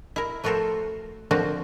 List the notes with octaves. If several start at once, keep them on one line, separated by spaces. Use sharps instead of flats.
E4 A#4
F3 A3 F#4 A4 A#4 C5
D3 F3 A#3 C4 F#4 A#4